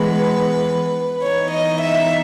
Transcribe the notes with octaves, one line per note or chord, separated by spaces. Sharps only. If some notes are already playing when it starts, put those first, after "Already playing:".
Already playing: E3 G#3 B3 B4
E3 B3 D#4 C#5
D#5
E5